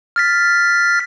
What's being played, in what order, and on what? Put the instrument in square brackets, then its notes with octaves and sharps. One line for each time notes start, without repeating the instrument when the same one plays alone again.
[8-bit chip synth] F6 A6 B6